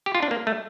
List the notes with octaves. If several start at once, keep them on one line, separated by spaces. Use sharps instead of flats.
G4
F4
D4
A#3
A3